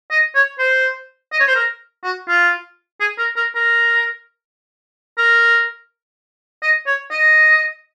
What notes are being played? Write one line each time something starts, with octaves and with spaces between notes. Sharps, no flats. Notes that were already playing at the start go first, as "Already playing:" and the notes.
D#5
C#5
C5
D#5
C#5
C5
A#4
F#4
F4
G#4
A#4
A#4
A#4
A#4
D#5
C#5
D#5